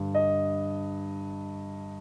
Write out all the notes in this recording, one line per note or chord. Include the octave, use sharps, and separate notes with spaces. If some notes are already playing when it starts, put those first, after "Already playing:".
Already playing: G2 D3
D#5